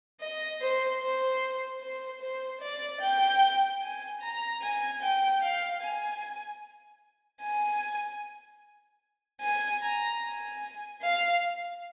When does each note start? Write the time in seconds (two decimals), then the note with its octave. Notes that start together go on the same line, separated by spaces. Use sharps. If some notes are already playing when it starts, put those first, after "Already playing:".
0.21 D#5
0.61 C5
1.01 C5
1.81 C5
2.21 C5
2.61 D5
3.01 G5
3.82 G#5
4.21 A#5
4.62 G#5
5.01 G5
5.42 F5
5.81 G#5
7.42 G#5
9.41 G#5
9.82 A#5
10.22 G#5
11.02 F5